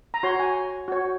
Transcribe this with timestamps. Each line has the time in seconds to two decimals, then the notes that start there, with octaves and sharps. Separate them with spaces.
0.14 A#5
0.23 F#4 C#5 C6
0.40 G#5
0.88 F#4 C#5